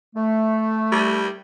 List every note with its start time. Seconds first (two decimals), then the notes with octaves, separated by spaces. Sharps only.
0.15 A3
0.92 G3